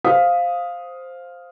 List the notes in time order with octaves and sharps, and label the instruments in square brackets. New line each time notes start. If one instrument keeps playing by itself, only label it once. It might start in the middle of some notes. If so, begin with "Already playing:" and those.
[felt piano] C5 F5 D#6 B6